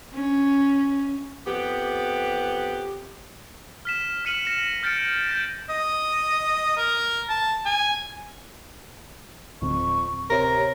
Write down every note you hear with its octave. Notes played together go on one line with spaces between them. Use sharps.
C#4
F2 B3 G4
F6 B6 E7
F6 B6 C#7 D#7 E7 F#7
A#6 C#7 E7
F6 G6 A6 A#6 C#7 D7
G6 A#6 D7
D#5
A#4
A5
G#5
D1 F2 C#6
C3 A#4 C#5